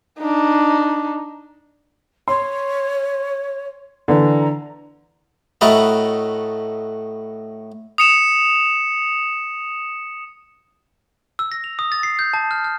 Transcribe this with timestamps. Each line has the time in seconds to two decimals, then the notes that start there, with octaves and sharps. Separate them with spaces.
0.19 D4 D#4
2.28 C#5 C6
4.08 D3 E3 A#5
5.61 A2 A3 F#4 A#4 B4 D#5
7.98 D#6 C#7 E7
11.39 E6
11.52 A#6
11.64 F7
11.79 D#6
11.92 A6
12.03 C7
12.19 G6
12.34 A5
12.51 F6
12.64 F6